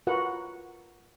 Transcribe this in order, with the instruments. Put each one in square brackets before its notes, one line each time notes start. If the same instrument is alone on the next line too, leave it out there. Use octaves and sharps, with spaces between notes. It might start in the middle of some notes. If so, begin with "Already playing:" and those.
[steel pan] F4 F#4 A#4 B4 F#5